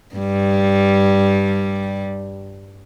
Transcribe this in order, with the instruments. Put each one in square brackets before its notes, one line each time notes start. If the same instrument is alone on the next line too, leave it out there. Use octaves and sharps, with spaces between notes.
[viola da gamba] G2 G3